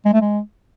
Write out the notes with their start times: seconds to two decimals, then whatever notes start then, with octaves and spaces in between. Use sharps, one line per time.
0.05 G#3
0.13 A3
0.21 G#3